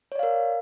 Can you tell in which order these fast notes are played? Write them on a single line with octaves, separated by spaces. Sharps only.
C#5 D5 F5 A#4